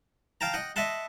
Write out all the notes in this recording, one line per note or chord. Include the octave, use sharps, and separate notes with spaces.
F5 G5 A5 A#5
D#5 F#5 G5
D#5 E5 F#5 A5 C6